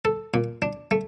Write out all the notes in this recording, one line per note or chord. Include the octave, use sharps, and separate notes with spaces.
A4
A#2
D4
A3